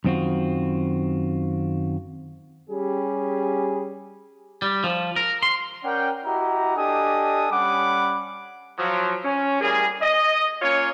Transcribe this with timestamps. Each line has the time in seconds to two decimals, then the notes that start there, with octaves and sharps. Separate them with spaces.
0.04 F#2 D#3 C4 D#4 F4 F#4
2.70 G3 C#4 G4 G#4
4.62 G3
4.84 F3
5.16 A#4
5.43 C6
5.84 C#4 A#4 D5 F#5 G5
6.25 E4 F#4 G4 D#5 A#5
6.76 D4 G4 A4 D#5 G#5 D#6
7.52 G3 C#4 F#5 B5 D6
8.78 F3 F#3
9.24 C#4
9.61 A2 G3 A#3 G#4
10.02 D#5
10.62 A#3 C#4 F4 C#5